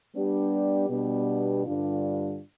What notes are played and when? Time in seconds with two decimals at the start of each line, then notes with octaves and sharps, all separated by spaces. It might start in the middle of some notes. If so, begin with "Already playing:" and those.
0.14 G3 B3 D4 G4
0.89 B2 G3 B3 D4 G4
1.65 G2 D3 G3 D4 F4